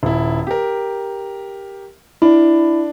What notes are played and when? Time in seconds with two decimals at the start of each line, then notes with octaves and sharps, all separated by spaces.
0.03 D#1 E4
0.47 G4 A#4
2.22 D4 E4